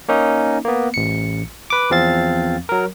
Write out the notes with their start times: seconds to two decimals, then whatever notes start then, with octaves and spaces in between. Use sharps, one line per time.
0.09 A#3 C#4 D#4
0.65 A#3 B3
0.94 A1 C#7
1.70 B4 D6
1.90 E2 F3 C4 F5 A6
2.69 F#3 A#4